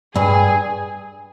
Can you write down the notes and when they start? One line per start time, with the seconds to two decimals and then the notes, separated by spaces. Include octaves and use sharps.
0.15 G2 G#4